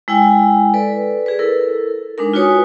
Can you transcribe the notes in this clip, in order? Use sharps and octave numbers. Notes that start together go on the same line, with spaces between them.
G#3 E4 G5 G#5
A4 B4 D5
G#4 B4
E4 A4 A#4
G#3 D4 D#4 A#4
F4 F#4 B4 C#5 G#5 D#6